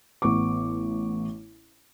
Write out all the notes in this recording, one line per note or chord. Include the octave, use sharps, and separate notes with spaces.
A1 B3 C#6 D6